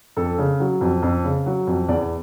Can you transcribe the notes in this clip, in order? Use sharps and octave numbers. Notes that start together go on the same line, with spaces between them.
F2 A4
C#3
F#3
F2
F2
C#3
F#3
F2
E2 D5